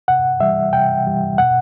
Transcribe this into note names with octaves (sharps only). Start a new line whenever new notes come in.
C3 F#5
E3 G3 E5
C3 G5
E3 G3
B2 F#5